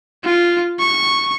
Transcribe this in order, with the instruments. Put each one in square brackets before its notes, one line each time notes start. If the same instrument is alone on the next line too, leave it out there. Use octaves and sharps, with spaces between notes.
[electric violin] F4
C#6